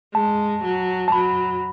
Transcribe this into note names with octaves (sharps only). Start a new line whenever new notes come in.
G#3 A5
F#3
A5
F#3 B5